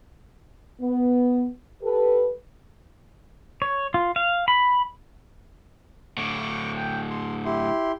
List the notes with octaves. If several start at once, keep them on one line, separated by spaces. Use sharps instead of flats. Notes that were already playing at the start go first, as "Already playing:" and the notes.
B3
G4 A4 B4
C#5
F4
F5
B5
A2 D3 C#6 D6
G5
C6
E4 G4 C6